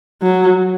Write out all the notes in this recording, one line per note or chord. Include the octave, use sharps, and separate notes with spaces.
F#3